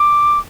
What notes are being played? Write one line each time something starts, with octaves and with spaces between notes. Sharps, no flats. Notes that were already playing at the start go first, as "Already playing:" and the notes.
Already playing: D6